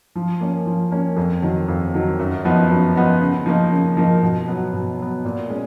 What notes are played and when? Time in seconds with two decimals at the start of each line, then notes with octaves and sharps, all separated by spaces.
0.16 F3
0.41 A#3 C#4
0.66 F3
0.91 A#3 C#4
1.17 F2
1.42 D#3 F#3
1.68 F2
1.94 D#3 F#3
2.19 F#2
2.45 F3 B3 D#4
2.70 F#2
2.96 F3 B3 D#4
3.21 C#3
3.46 F3 A#3 D#4 A#4
3.71 C#3
3.97 F3 A#3 D#4 A#4
4.22 B2
4.48 F#3 B3
4.73 B2
4.98 F#3 B3
5.25 A#2
5.50 G#3 C#4